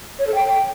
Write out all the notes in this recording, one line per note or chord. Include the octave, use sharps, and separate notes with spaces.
C#5
A4
G5